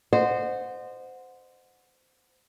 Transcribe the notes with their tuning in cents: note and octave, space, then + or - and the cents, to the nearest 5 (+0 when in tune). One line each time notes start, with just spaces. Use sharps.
C5 -15 D#5 -35 F#5 -20